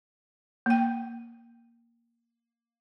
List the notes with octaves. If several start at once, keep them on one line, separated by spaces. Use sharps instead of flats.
A#3 G5